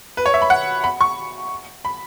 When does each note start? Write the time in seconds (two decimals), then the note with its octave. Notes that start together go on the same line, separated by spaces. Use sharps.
0.17 B4
0.26 C#5
0.34 E5
0.42 B5
0.50 F#5
0.84 B5
1.01 C#6
1.85 B5